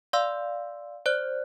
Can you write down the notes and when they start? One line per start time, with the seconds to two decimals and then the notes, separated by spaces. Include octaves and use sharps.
0.13 D5 F5 C6 E6
1.06 C5 D5 F#6